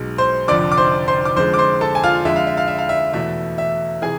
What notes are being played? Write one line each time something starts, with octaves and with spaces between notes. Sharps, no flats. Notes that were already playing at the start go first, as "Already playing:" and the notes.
Already playing: B1 B2 G#3
C5 C6
F1 F2 D3 F3 D5 D6
D6
C5 C6
C5 C6
D6
F2 D3 G#3 C5 C6
D6
C5 C6
A4 A5
G#5
F4 F5
F2 D3 G#3 E5
F5
E5
F5
E5
F5
E5
E2 B2 A3 E5
E5
C3 E3 G#4 G#5